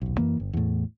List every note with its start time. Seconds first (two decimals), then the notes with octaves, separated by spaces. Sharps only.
0.02 D#1 B1
0.18 F#2 E3 A#3
0.40 G1
0.53 E2 A2